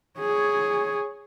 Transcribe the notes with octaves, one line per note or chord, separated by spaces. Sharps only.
G#4 C#5